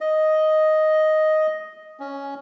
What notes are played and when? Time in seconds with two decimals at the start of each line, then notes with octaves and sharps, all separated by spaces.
0.01 D#5
2.00 C#4